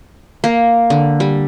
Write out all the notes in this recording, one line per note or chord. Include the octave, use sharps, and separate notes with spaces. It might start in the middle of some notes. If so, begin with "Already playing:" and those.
A#3
D3
G3